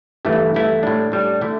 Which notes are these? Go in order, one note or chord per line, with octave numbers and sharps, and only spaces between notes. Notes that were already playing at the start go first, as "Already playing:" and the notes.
G1 G2 E3 A3 E4
G1 G2 E3 A3 E4
A2 G3 D4
A2 G3 D4
D3 A3 E4